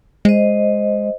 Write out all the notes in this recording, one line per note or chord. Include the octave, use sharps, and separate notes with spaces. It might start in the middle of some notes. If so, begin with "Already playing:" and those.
G#3 C5 D#5